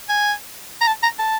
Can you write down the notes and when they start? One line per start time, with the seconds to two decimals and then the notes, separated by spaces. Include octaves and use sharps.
0.09 G#5
0.81 A#5
0.87 A5
1.03 A#5
1.19 A5